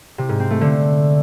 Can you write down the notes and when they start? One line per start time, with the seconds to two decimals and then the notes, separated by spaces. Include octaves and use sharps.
0.18 C3
0.29 G#2
0.40 C4
0.50 A3
0.61 D3